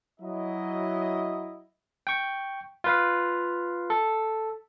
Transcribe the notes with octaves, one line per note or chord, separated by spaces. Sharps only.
F#3 E4 D#5
G5 C#6
F4 B4 F5
A4